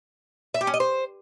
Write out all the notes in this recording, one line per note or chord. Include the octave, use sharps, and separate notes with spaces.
E5
G4
C#4
D#5
C5